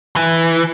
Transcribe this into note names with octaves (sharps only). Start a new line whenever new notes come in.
E3